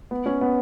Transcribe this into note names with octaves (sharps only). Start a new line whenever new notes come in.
B3
C#4
B3